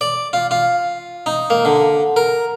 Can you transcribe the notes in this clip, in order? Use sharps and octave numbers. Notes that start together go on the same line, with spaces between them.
D5
F4
F4
D#4
A#3
D3
A#4